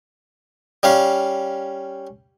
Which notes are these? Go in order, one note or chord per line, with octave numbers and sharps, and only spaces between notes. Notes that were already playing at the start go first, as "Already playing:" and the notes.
G3 C#4 F5